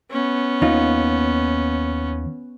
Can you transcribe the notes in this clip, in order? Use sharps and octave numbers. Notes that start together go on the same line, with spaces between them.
B3 C#4
D#2 D#4 F4